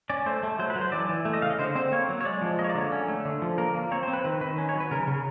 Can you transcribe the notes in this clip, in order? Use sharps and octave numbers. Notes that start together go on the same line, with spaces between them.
C#4 D5
A3 C5
A3
F#3 C5
B4
F#3
C5
E3 D5
E3
A3
D#5
C#3 F5
D#5
D3 C5
C4 C5
A#3 C#5
F#3
C#5
G#3 D5
F3
A#3 D#5
C#5
D5
D3
C#5
C#4
A3
D3
F3
A#3 A#4
A#3
C4 C#5
C5
C4
B4
D#3 B4
D#3 B4
C#4
C#5
F#3
B4
C#3 A#4
C#3